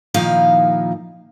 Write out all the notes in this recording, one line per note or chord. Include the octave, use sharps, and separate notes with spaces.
A#2 D#3 F3 D#4 E4 F5